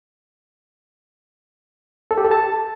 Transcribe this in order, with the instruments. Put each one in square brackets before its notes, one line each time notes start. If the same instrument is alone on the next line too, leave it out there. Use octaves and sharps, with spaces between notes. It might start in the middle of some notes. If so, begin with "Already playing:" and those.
[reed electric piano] A4
G4
A4
A5